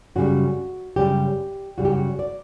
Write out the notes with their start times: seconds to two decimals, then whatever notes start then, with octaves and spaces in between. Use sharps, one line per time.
0.15 F#2 C#3 G3 F#4
0.96 F#2 C#3 G3 G4
1.78 F#2 C#3 G3 F#4
1.85 G4
1.92 F#4
2.19 D5